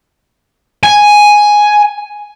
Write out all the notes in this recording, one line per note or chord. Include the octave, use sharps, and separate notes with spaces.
G#5